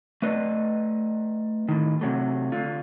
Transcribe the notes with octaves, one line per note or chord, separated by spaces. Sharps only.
A3 B4 D5 D#5
A2 D#3
C3 F#3 A3
D3 F4